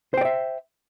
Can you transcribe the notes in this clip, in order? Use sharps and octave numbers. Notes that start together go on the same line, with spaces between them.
C5 D5 E5 G5